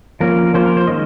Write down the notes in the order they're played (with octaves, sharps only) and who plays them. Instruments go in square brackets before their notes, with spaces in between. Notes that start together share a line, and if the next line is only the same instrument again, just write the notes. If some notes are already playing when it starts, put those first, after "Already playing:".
[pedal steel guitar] F3 A#3 C#4 A#4
F3 A#3 C#4 C5
A#4
C5
D#3 G#3 C#4 D#5